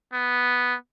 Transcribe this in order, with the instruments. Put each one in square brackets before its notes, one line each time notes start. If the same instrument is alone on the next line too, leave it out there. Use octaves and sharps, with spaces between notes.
[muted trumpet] B3